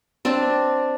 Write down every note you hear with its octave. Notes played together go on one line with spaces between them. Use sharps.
C4 D4